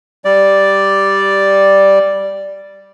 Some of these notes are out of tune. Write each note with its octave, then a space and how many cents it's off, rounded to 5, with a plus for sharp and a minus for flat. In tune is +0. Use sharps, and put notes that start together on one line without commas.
G3 +0 D5 +0